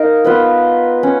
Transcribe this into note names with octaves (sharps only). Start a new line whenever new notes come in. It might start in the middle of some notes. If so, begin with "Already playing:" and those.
Already playing: D#4 A#4 F5
B3 F4 B4 D#5
C#4